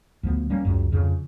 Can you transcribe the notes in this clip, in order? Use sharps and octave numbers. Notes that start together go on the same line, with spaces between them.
D2 F3 B3
G3 A#3 C#4
C#2 F#2
F2 C#3